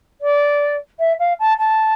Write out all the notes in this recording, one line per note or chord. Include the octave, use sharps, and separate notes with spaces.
D5
E5
F5
A5
A5